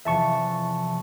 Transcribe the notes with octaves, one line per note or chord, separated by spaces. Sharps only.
E2 C3 F3 E5 A5 C#6